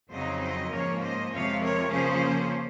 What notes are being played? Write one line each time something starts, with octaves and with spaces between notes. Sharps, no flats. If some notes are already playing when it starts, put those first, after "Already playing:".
F2 C#3 F#3 C4 D#4 C5 D#5
C5 D#5
G#2 F3 A#3 C#4 A#4 C#5
C5 D#5
F2 C3 F3 G#3 C#5 F5
A#4 C#5
C#3 F3 A#3 C#4 G#4 C5